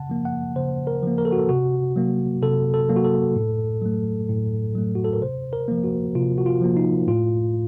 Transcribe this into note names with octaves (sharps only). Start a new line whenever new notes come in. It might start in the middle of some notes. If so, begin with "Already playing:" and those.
Already playing: C#3 F#5 A5
F3 A#3
F#5
C#3 C5
A#4
F3 A#3
A#4
A4
F#4
A4
C3 F#4
F#3 A#3
C3 A4
A4
F#3 A#3
F#4
A4
A2
F#3 A3
A2
F#3 A3
F#4
A4
A#4
C3 C5
A#4
F3 A#3
F#4
C3 F4
F#4
F4
F3 A#3
D#4
A2 F4